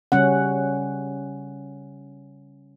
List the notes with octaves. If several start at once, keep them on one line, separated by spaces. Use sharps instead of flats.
C#3 G3 C#4 F#5